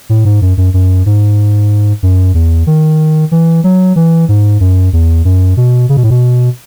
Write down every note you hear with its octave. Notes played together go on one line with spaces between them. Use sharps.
A2
G#2
F#2
F#2
F#2
G#2
F#2
E2
D#3
E3
F#3
E3
G#2
F#2
E2
F#2
B2
C#3
B2
A2
B2